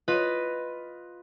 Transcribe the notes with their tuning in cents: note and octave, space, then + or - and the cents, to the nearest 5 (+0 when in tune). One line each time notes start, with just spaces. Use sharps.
F4 +10 B4 +5 D#5 +0